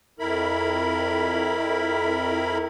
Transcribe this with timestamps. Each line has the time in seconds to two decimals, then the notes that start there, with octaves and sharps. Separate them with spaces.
0.19 F2 E4 A#4 B5